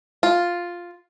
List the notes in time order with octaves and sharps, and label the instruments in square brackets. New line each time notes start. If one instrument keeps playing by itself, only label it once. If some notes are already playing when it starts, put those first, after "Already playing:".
[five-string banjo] F4